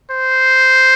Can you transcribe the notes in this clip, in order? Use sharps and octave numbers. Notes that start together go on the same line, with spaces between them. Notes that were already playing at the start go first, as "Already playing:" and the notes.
C5